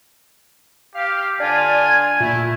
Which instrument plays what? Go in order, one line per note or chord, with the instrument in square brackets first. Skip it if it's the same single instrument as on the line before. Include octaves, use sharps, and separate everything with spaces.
[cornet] G4 [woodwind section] F5
[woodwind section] D3 D4 F4 [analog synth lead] D5 [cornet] G#5
[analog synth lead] G#6
[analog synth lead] A#2 [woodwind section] A3 E4